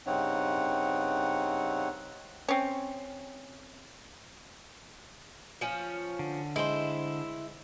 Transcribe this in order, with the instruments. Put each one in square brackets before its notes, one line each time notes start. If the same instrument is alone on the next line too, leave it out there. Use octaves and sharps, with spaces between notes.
[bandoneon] G2 C#3 C4 D#4 C#5 F#5
[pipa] C4 C#4
[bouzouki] F3 C#4
[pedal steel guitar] D3
[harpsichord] G#3 [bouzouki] E4 C5